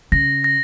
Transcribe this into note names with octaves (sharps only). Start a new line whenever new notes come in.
C#3 A#6
A#6